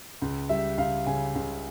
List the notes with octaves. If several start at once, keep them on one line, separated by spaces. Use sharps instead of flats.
C#2
G3 E5
C#2 F5
C#3 G#5
C#2